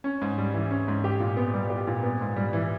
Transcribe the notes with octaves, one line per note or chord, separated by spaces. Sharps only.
C#4
G#2
G3
E3
C#4
G#2
G4
A#2
B3
G3
G4
A#2
B3
G#2
G3
E3